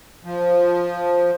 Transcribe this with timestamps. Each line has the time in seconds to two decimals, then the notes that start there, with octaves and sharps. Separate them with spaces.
0.24 F3